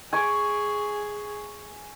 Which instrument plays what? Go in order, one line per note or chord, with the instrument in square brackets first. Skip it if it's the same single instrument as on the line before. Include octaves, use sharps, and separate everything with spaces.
[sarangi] G#4 [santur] G#5 C#6 D6